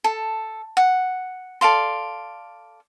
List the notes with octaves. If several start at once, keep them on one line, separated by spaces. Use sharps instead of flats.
A4
F#5
A4 D5 F5 C6